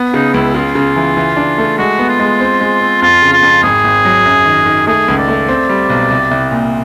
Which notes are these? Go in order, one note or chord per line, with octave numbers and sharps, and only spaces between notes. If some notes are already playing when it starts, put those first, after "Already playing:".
Already playing: B3
C#3 D#4
C#2 E4
C#3 F4
C#3
E3
E3
D4
A3
G#3 F#4
B3
F4
G#3
C4
G#3
C4
F2 F4
C#3
F4
F2
G#1 G#4
G#1
F#3
F#2
D#3
D#3
A3 G#4
C#2
D5
A3
C4
G3
B1
C2
C2
A#2